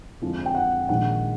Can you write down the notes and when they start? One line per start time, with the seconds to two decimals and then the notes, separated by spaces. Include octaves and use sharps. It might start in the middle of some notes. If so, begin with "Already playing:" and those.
0.22 F2 D3 F3 G#3
0.46 G5
0.55 F#5
0.89 A#1 G#2 D#3 G#3 F#5